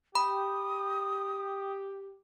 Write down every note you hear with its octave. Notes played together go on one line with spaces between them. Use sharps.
G4 B5 D#6